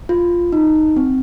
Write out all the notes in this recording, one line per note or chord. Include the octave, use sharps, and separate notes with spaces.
F4
D#4
C4